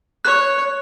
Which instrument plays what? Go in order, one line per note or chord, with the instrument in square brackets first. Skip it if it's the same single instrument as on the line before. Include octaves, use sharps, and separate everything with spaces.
[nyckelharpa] C#5 [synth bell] F#6